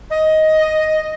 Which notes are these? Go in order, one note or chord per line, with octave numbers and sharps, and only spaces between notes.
D#5